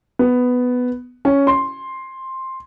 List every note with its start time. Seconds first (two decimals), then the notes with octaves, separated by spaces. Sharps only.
0.19 B3
1.25 C#4
1.47 C6